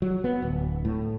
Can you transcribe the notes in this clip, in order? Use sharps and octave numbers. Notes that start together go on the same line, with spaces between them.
F#3
B3
D1
A2